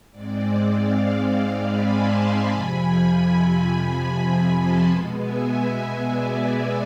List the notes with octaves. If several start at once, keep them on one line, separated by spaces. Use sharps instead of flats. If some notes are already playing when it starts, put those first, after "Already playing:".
G#2 G#3 C4 D5
D5 F5
D5 F5
G#5 B5
A5 C6
G#5 B5
F2 C3 F3 G#5 B5
G#5 B5
A5 C6
B2 G#3 B3
E5 G#5
D5